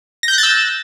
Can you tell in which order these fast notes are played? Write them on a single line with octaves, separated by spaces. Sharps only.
A#6 G6 F#6 A6 E6